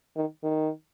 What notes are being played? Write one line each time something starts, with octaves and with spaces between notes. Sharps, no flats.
D#3
D#3